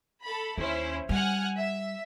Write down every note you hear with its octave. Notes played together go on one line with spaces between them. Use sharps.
A4 B5
D#2 C#4 E4 C5
G3 F#5 G#5 F6
E5